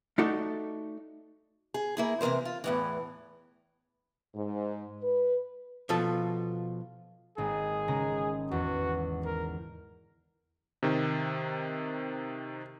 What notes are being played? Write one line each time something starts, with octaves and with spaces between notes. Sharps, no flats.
A3 D#4 F#4 A4 D5
G#4
A#3 E4 G#4
C3 E3 G#3 A#4 C5
F4
E2 A2 E3
G#2
B4
B2 F3 F4 A4
G#1 A#3 G#4 D#7
C#3 G#3 A#5
E2 F#4
A#4
C3 D#3